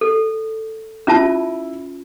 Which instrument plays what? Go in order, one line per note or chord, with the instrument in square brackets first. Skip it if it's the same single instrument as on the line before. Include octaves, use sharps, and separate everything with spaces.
[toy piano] A4
[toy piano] C#4 F4 A5 [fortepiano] E4